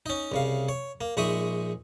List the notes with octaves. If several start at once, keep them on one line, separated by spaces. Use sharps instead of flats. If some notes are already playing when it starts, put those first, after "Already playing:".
C#4 D#4
C2 C#3 F5
C#5
A#3
A#1 G#3 D#4 E5 C#6 D#6